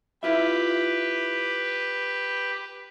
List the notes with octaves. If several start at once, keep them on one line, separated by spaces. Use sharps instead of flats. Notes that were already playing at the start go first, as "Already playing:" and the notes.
E4 F4 G4 B4 E5